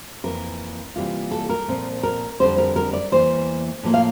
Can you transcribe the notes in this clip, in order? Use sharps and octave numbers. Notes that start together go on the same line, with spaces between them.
F2 E3 A#3 A#4
C3 E3 G3 A#3 F4
A4
A#4
A#2 F3 C4
A#4
F2 D3 G3 C4 C5
A#4
A#4
D5
E2 E3 A#3 C5
A2 F3 A#3 F4
F5